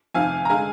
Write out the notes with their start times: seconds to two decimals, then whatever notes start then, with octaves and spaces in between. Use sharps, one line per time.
0.14 F2 C3 D#3 F5 G#5
0.45 A#5
0.50 D3 G#3 F5 G#5